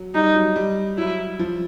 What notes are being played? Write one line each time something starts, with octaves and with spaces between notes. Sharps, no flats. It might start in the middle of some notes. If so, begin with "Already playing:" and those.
Already playing: F#3
G3 D#4
F#3
G3
F#3 E4
F3